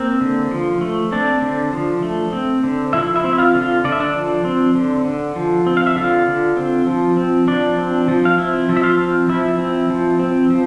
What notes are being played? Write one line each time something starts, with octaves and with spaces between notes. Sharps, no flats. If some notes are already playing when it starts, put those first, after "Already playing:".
Already playing: A#3 C4 A#4
D3
F3
A3
C4 D4 D5
D3
F3
A3
C4
D3
F3 E4 E5
E4 E5
C4
E5
F4 F5
D3
F4 F5
D3 D5
E5
D4 D5
F3
C4
D3
D3
F3
C4
F5
E5
D3 F4 F5
D3
C4
F3
C4
F3 D4 D5
C4
F3
F5
C4 E4 E5
F3
E5
F4 F5
C4
F3 E4 E5
C4
F3
C4
F3